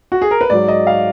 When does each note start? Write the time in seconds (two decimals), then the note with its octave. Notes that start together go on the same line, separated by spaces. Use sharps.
0.12 F#4
0.22 G#4
0.31 A#4
0.41 B4
0.50 G#2 F#3 D5
0.68 D#5
0.87 F5